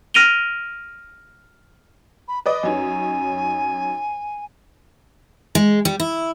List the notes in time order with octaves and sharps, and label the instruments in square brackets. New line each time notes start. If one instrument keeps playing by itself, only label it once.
[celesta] F6 A#6 D7 D#7 F7 G7
[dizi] B5
[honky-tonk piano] B4 D5 D#5 [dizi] D#6
[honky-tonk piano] F#2 C#4 D#4 [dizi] G#5
[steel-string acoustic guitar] G#3
G3
E4